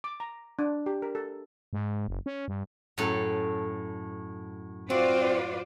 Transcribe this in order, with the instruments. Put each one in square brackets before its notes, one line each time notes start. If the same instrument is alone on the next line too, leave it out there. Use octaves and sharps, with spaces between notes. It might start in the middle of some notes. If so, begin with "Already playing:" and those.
[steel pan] D6
A#5
D4
G4
A#4
A4
[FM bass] G#2
F#1
C#4
G2
[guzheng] F#2 A2 A4
[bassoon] C4 [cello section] F4 C5 D5 [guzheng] F#4